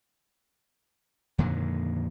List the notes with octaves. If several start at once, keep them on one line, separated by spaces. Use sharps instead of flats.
F2 A#2 D3 D#3